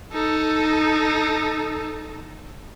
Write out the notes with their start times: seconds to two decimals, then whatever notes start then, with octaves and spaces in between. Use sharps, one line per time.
0.12 D#4 A4